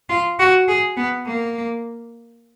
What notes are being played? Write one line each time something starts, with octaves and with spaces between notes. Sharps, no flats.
F4
F#4
G#4
B3
A#3